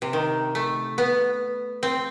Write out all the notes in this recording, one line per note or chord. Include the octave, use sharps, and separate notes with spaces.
C3
D#3
A3
B3
C4